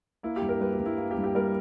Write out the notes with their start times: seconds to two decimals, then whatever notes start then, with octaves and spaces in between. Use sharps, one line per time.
0.23 A#3 E4
0.36 G4
0.42 G2
0.49 A#4
0.60 G3 B4
0.73 G4
0.80 G2
0.86 E4
0.98 A#3
1.11 G4
1.17 G2
1.24 G4
1.35 G3 A#4